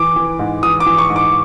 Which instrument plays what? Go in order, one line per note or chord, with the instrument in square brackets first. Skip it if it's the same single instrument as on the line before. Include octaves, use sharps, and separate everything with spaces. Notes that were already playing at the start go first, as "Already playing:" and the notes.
Already playing: [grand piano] E3 D6
E3
G#2
E3 D#6
D6
E3
C#6
G#2
D6